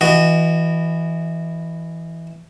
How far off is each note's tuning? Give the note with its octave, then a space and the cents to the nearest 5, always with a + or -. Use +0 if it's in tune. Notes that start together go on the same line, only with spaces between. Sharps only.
E3 +0 F#4 +0 D#5 -25